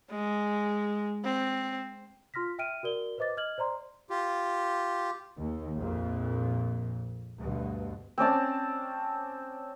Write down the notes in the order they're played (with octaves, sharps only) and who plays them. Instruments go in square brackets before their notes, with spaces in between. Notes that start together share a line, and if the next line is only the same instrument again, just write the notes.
[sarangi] G#3
C4
[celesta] F4 C6 F6 A#6 B6
E5 G5 F6 D7 D#7
F#4 A#4 D5 G7
B4 C5 D#5 D6 A6
D#5 F6 G#6 F#7
C5 D5 A#5 C6
[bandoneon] F4 G4
[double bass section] D#2
A#1 F2 A#2
D2 G2 B2
[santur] C4 C#4 D5 A5